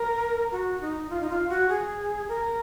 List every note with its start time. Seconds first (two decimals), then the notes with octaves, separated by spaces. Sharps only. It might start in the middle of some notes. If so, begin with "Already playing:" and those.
Already playing: A#4
0.52 F#4
0.81 D#4
1.10 F4
1.20 D#4
1.30 F4
1.49 F#4
1.69 G#4
2.28 A#4